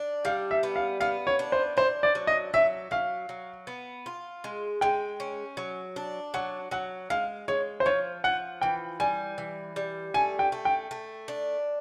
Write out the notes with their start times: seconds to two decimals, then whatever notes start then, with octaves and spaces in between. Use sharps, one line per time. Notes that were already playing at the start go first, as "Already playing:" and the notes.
Already playing: D4
0.25 G3 F5
0.51 E5
0.63 B3
0.76 F5
1.00 B3 F5
1.27 C#5
1.39 D4
1.52 C5
1.77 D4 C5
2.03 D5
2.15 F#3
2.27 D#5
2.54 F#3 E5
2.91 F#3 F5
3.29 F#3
3.67 B3
4.06 F4
4.44 G#3
4.81 G#3 G5
5.20 C#4
5.57 F#3
5.96 D4
6.34 F#3 F#5
6.71 F#3 F#5
7.10 G#3 F5
7.48 G#3 C#5
7.80 C5
7.86 F3 C#5
8.24 F3 F#5
8.61 E3 G5
9.00 G3 G#5
9.38 E3
9.76 G3
10.14 A3 G#5
10.39 G5
10.52 A3
10.65 G5
10.91 A3
11.28 D4